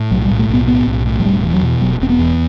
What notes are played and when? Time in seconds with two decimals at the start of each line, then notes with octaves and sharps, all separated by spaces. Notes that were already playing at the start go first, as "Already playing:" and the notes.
Already playing: A2
0.11 B1 F#3
0.25 G3
0.30 A2
0.39 A3
0.49 B1 B3
0.67 A2 B3
0.87 B1
1.05 A2
1.20 F#3
1.25 E1 G3
1.43 E2
1.54 F#3
1.63 B2
1.81 E1 F#3
2.00 E1 C4
2.10 B3
2.19 E2